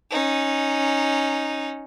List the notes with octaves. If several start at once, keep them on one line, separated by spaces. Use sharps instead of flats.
C#4 D#4